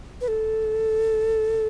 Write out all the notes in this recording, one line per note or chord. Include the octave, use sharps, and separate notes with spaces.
B4
A4